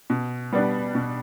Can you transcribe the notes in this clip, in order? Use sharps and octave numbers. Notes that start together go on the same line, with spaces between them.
B2
G3 B3 D4
B2